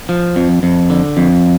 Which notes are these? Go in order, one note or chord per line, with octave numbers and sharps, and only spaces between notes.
F3
F2
F2
D3
F2